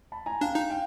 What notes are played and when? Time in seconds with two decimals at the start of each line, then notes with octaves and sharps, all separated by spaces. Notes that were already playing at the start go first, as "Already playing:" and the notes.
0.12 A5 B5
0.26 G#5 A#5
0.41 D4 F5 G5
0.55 D#4
0.70 F5 G5